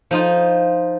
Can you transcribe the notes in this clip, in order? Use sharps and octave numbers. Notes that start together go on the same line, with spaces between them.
F3 D#4 F4